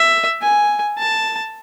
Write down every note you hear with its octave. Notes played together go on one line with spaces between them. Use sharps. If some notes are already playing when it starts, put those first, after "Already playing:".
Already playing: E5
G#5
A5